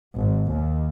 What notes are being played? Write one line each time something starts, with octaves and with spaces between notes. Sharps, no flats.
G#1
D#2